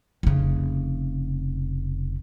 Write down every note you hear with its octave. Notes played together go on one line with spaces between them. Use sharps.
F1 C#3